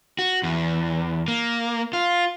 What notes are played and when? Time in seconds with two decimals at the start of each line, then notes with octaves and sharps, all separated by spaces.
0.19 F#4
0.43 E2
1.28 A#3
1.93 F4